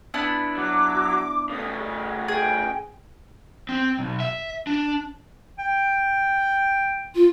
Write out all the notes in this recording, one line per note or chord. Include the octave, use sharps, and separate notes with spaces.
B3 D4 E4
F#3 D6
C#3 A3 D#6
G#4
G#4 G5
C4
B1
E5
D4
G5
F4